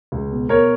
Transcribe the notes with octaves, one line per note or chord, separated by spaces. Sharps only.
C#2
B2
B2 A#4 C#5